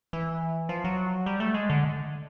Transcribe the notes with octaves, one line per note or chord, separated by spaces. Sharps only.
E3
F3
F#3
G3
A3
G#3
D3